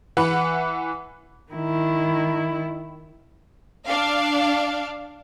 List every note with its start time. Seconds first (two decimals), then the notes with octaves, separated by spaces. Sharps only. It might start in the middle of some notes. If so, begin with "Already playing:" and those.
0.17 E3 B4 F#5 B5
1.53 D#3 E4
3.87 D4 F5